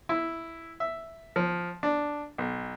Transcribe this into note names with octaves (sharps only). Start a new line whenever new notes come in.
E4
E5
F3
D4
B1